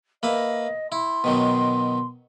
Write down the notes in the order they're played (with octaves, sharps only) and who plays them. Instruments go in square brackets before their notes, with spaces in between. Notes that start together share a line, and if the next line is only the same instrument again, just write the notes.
[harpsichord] A#3 B4 E5 [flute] D#5
[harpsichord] E4 [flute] C6
[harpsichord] B2 D#3 F#3